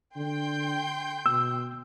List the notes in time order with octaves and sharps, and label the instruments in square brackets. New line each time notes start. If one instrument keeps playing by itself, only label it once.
[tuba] D3 [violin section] G5 C6 G6
[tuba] B2 [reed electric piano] E6